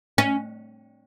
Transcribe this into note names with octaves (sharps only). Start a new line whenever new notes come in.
C#4